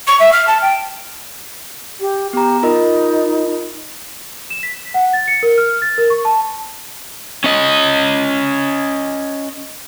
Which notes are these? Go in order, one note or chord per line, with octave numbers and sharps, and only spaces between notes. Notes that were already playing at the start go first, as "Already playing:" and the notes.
C#6
E5
F6
A5
G5
G4
B3 G4 A#5
D#4 F4 A#4 D#5
E7
B6
F#5
A6
C#7
A#4
F6
A6
A#4
C#6
A5
C#4 D#5